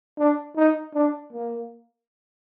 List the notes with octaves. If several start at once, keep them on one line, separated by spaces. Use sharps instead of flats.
D4
D#4
D4
A#3